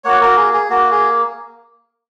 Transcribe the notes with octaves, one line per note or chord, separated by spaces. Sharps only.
A#3 F#4 C#5 F#5
F#4 A#4
G#4
G#4
A#3 F#4
G#4